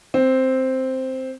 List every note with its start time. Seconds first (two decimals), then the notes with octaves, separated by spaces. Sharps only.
0.14 C4